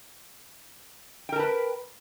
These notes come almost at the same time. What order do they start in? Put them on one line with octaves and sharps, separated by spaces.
G5 A#4 A5 B4